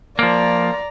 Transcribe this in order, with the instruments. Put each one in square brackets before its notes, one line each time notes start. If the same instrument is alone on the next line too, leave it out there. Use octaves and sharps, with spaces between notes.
[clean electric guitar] F3 A#3 [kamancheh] D5 A#5